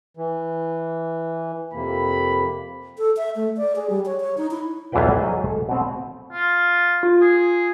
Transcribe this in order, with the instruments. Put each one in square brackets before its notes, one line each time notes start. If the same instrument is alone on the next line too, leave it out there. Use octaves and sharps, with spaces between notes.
[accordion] E3
[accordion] F2 C3 A#3 [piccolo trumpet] B5
[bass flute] A4
E5
A3
D5
G#4
G3
C#5
C#5
D#4
E4
[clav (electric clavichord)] B1 E2 E3 F4 B4 G5
F#3 G#4 C5 D#5
A4
B2 C4
[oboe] F4
[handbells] F4
[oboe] G#4